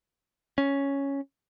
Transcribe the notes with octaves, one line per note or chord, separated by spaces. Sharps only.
C#4